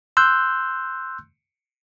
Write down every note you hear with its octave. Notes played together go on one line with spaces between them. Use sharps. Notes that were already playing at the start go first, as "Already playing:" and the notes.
C6 E6 F#6 G6